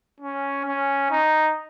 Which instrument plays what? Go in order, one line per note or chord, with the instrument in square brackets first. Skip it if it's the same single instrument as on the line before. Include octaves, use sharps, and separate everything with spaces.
[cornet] C#4
C#4
D#4